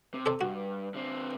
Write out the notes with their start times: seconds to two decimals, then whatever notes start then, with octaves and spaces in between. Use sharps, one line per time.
0.14 C3
0.26 A4 C5 D5
0.41 G2 F#4
0.94 D3 C4